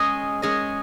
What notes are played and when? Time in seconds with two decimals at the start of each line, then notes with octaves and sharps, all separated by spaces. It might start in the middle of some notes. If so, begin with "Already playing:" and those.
Already playing: G#3 C#4 G#4 D#5
0.42 G#3 C#4 G#4 D#5